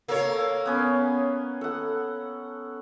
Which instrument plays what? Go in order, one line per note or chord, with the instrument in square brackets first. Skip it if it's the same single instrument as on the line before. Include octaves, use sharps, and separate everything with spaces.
[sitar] A#3 C#5 [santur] A4
[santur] B3 C#4 G#5
A4 F#5